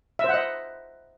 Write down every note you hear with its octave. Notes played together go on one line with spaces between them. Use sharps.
C5 D#5 E5 F#5